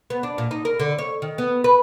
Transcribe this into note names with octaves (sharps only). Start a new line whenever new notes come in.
B3
D4
A#2
D#4
A#4
D3
C#5
D#3
B3
B4